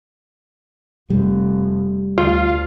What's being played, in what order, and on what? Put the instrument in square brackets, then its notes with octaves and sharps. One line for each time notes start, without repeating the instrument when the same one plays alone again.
[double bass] F1 [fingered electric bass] G3
[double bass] D2 [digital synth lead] F4